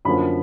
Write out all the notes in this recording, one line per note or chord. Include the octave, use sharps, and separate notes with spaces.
F#2 D3 F3 A#3 B5